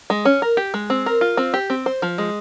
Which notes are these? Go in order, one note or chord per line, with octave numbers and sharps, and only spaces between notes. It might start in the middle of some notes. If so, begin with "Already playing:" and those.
G#3
C#4
A#4
G4
G#3
C4
A#4
F4
C4
G4
C4
C5
F3
G#3